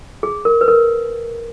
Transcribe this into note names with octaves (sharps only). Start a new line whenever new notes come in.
G#4
A#4
B4
A#4